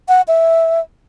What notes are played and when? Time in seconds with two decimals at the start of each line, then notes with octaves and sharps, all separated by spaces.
0.08 F#5
0.28 E5